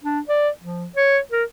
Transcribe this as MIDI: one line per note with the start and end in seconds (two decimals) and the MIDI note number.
0.04 0.20 62
0.29 0.49 74
0.60 0.87 53
0.96 1.18 73
1.32 1.44 70